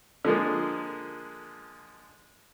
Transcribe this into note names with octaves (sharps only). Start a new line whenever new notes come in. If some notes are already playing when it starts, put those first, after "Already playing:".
D3 F3 G#3 A#3